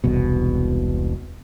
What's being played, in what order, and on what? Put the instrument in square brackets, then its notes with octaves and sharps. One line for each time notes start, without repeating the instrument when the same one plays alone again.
[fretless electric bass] E1 C2 B2